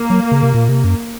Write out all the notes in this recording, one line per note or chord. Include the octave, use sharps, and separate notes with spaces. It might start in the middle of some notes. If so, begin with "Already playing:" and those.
Already playing: A#3
F#3
C#3
C3
A#2
C3
F#2